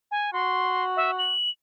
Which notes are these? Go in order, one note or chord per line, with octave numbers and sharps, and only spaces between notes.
G#5
F#4 C6
E5
F#7